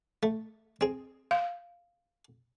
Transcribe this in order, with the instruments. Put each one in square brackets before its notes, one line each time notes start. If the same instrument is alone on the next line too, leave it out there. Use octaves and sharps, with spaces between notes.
[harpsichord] A3
C4 G#4
[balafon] F5